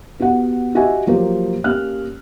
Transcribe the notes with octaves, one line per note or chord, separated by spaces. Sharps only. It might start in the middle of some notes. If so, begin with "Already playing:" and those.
B3 F#4 G4 F#5
F#4 G4 D#5 E5 G#5
F3 F#3 A#3 G4 C5
A#3 C#4 G4 F6 F#6